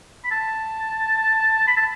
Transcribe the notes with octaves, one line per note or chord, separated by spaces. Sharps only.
B5
A5
B5
A5